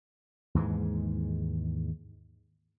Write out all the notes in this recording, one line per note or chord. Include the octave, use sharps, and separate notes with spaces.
D#2 G#2 E3 G#3